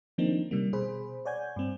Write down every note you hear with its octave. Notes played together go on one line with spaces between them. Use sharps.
D#3 F3 A#3 C4 D4 D#4
C3 G3 A#3
B2 G#4 C5 B5
C#5 D5 F#5 G#5 G6 G#6
G2 C4